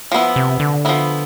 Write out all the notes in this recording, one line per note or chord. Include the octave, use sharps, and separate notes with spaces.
F3 B3 E4
C3
D3
F3 B3 E4